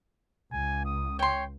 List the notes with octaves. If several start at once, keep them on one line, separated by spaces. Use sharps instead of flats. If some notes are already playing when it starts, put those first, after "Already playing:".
C#2 G#5
D#6
C#5 G5 C6